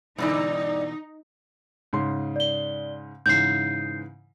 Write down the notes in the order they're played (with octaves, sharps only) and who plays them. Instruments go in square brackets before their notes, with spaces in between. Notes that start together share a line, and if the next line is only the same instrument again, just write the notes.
[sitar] G2 D5 [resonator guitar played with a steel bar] B2 D3 E3 [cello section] D#4
[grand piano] G#2 C#3 C6
[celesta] D5 G7
[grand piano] G#2 C#3 E3 [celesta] G6 C7